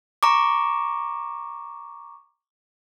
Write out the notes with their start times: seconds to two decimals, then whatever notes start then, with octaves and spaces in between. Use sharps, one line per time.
0.23 A#5 C#6 D6